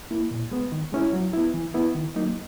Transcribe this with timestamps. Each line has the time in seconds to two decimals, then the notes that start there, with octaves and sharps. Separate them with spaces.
0.11 A#3 E4
0.31 A#2
0.51 G#3 B3
0.72 D#3
0.92 G#3 C#4 E4
1.13 F#3
1.33 B3 E4
1.54 E3
1.74 B3 E4
1.95 D#3
2.16 F#3 A#3 D#4